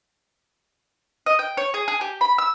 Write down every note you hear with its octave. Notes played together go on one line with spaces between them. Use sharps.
D#5
G5
C#5
G#4
G#4
G4
B5
E6